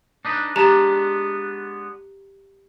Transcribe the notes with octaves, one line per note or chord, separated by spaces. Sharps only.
D4 D#4 B4
G#3 B3 D4 G4 A5 A#5